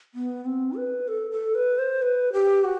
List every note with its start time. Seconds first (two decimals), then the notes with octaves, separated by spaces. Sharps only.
0.15 B3
0.45 C4
0.77 B4
1.08 A4
1.31 A4
1.55 B4
1.78 C5
2.02 B4
2.33 G4
2.64 F#4